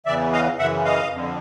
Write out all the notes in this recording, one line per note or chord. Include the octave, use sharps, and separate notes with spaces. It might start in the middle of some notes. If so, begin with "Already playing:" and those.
E2 C#3 E3 D5 E5
D#5 F5
F#2 C#3 E3 E5 F#5
D#5 F5
F2 D3